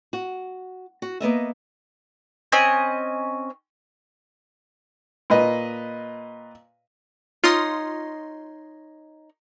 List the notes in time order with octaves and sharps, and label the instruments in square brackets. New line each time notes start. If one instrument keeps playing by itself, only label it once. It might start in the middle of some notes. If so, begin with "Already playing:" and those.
[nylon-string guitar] F#4
F#4
A#3 B3 D#5 E5
[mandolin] C4 C#4 D#5 G#5
[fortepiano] A#2 B4 D#5
[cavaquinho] D#4 C#5 D#6 [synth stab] F4 C6